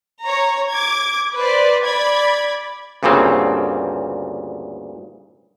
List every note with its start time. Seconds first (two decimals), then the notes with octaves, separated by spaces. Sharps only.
0.22 C#5 A#5
0.71 D6 G#6
1.34 B4 C5 D5
1.84 D5 B5 G#6
3.03 D2 G2 A#2 C#3 C4